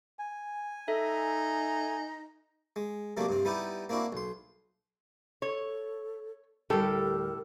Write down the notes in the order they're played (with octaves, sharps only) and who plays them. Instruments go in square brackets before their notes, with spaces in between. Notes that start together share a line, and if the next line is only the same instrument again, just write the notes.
[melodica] G#5
[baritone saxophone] D#4 [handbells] A4 E5
[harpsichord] G#3
C3 F#3 A3 A#3 D4
G2 C3 C4
G3 B3 D#4 E4 G4
A#3 C4 D4 E4 F#4
B1 C6
[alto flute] A4 [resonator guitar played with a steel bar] C#5
[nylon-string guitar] D2 G3 [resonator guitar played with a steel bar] A2 G4 A4 [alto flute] A#4